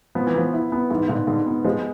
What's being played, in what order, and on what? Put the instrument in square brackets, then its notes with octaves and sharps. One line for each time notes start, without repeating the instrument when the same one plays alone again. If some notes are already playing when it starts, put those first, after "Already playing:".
[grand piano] F3 [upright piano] B3
[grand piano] E3
[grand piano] F3 [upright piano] B3
[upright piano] E4
B3
[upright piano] G#2 [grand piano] E3
[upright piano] G#2 [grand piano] D3
[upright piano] G#2 [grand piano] D3
[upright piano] B3
[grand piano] F3 [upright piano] G#3